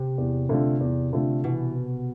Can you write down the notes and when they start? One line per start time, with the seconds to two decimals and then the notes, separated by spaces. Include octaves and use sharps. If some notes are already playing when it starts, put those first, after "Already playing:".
Already playing: C3
0.18 E2
0.49 D3 A3 C4 F4
0.81 E2
1.13 D3 A3 C4 F4
1.44 B2 E3